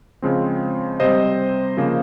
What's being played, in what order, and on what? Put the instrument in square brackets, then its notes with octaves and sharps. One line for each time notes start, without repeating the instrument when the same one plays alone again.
[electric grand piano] C#3 F3 G#3 C4
C3 G3 C4 C5 D#5
C#3 F3 A#3